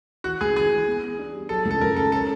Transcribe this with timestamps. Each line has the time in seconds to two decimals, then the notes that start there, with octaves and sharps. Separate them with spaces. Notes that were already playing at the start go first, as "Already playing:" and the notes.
0.24 E3 F#4
0.41 C#2 G#4
0.56 E3 G#4
0.71 E3
0.87 B3
1.03 B3
1.19 D4
1.34 G3
1.49 F#3 A4
1.65 C#2
1.71 A4
1.81 C#2 A#4
1.96 C#3 A4
2.12 C#4 A4